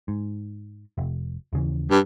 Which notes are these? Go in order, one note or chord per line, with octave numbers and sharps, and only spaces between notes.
G#2
F1
D#2 C#3 E3
G2